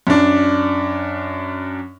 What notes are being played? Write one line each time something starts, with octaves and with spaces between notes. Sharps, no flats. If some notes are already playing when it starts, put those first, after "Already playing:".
F#2 D4